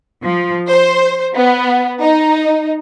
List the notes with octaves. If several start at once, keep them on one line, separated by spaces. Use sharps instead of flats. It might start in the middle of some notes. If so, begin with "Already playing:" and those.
F3
C5
B3
D#4